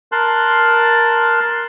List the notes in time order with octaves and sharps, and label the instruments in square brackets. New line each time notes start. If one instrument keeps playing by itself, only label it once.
[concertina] A#4 A5 C6 F#6